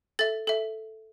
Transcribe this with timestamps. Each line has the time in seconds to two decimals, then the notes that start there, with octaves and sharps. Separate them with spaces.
0.19 A4 E5 A6
0.47 A4 E5